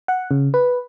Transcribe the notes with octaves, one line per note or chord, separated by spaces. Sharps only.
F#5
C#3
B4